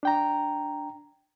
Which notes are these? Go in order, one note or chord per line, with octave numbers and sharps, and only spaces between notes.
D4 G5 A#5